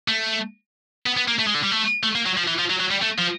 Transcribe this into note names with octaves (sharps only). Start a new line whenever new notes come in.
A3
B3
B3
A#3
A3
G#3
D3
G3
A3
A3
A#3
F#3
F3
E3
F3
F#3
F#3
G3
A3
F3